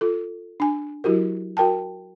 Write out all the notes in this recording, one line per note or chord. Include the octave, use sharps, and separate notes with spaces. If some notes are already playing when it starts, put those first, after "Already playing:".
F4 A4
D4 G#5
F#3 E4 F#4 G4 A#4
F#4 A#4 G5 A5